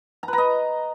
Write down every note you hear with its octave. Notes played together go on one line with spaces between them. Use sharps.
A#5
B4
A#5
D#5